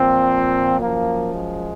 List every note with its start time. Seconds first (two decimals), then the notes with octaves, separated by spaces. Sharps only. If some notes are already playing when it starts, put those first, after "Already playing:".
Already playing: A#2 F3 C4
0.80 F#2 F3 A#3
1.35 G#3